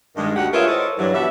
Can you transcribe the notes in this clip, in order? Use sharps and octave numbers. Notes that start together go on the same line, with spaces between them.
G2 D#3 G#3
D2 F#4 G4 F#5
F4 G#4 A#4 B4 C#5 E5
E4 A4 A#4 C5 C#5 D#5
G2 E3 F#3
B2 G3 F#4 E5